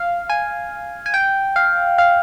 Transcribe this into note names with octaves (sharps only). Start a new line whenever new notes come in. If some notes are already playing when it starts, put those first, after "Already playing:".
Already playing: F5
G#5
G#5
G5
F5
F5